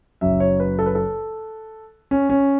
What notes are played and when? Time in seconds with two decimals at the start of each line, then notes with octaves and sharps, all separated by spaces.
0.21 F#1 F#2 C#3 E5
0.40 C#5
0.60 B4
0.79 A4
0.86 B4
0.95 A4
2.11 C#4
2.29 C#4